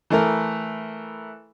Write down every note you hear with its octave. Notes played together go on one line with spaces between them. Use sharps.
E3 A3 E4 A#4